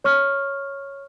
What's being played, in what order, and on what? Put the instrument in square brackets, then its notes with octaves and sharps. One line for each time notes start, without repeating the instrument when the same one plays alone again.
[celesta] C#5 C#6 F6